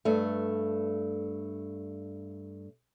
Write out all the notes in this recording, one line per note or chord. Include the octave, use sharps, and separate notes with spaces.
G2 A3